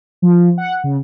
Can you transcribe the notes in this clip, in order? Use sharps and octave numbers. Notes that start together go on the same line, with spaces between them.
F3
F#5
C#3